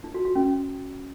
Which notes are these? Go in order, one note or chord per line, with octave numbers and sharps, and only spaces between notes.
D#4
F#4
F#4
C#4